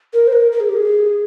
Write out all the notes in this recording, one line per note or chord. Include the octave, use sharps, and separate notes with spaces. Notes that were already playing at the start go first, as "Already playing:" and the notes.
A#4
C5
A#4
A#4
G#4
G4
G#4